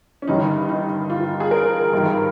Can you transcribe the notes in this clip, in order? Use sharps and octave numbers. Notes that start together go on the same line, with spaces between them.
C#4
G1 G2 D#3 D#4
D#4
F4
G#4
A#4
G#1 G2 D#3